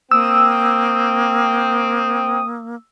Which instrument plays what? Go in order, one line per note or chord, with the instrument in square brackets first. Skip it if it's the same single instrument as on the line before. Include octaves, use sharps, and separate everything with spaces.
[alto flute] A#3 [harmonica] C4 G5 [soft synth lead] D#6 [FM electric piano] E6